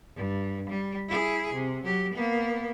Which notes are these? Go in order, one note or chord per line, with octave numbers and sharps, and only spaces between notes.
G2
G3
E4 G#4
C3
F#3 G4
A#3 B3